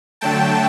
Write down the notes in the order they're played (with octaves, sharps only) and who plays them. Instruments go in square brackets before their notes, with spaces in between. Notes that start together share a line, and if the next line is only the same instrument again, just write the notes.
[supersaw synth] D3 F#3 A3 G5 A5